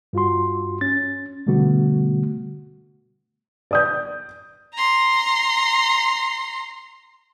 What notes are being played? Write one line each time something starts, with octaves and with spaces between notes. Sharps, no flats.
G2 F4 F#4 C6
C#4 A6
B2 D3 G3 A3 B3 F#4
D5 D#6 G6
A#5 C6